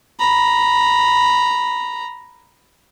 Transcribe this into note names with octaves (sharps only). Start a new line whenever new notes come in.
A#5 B5